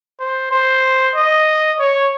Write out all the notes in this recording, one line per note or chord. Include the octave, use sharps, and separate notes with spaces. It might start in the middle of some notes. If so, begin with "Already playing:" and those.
C5
C5
D#5
C#5